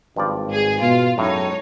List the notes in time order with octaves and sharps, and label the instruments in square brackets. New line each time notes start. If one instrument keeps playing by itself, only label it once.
[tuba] G#1 [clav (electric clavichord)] G2 F3 D5
[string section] G#2 G#4
[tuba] B2 [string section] F4
[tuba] F#2 [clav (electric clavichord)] A2 [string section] G#3 D#4 C#5